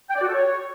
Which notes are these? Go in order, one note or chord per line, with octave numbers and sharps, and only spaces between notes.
G5
D5
F#4
A4
C#5